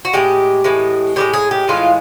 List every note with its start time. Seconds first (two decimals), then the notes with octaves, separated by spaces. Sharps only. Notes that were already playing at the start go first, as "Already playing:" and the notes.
0.05 F#4
0.13 A2 E3 G#3 G4
0.64 A2 E3 G#3
1.16 A2 E3 G#3 G4
1.33 G#4
1.51 G4
1.68 A2 E3 G#3 F4